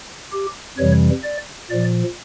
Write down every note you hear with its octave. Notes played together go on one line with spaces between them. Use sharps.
G4
F2 C3 E3 G3 C#5
D5
A#2 F3 D5